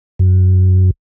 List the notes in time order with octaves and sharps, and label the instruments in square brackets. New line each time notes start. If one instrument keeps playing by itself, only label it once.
[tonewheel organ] F#2